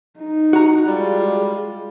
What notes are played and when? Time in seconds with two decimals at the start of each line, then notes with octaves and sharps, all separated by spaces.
0.19 D#4
0.53 F#4 A#5
0.87 G3 G#3 F4